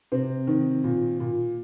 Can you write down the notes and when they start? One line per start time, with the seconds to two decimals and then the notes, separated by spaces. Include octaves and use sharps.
0.12 C3 C4
0.47 D#3
0.84 A#2
1.20 A#2